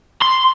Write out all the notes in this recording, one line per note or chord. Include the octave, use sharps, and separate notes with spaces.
C6